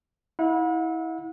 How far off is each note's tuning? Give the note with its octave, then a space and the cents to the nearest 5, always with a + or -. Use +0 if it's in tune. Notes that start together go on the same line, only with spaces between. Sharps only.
E4 -25 F#5 -40